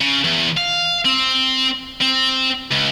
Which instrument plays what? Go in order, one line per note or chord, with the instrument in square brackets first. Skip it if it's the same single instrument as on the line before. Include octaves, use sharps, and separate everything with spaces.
[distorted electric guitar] C#3
E2
F5
C4
C4
C#2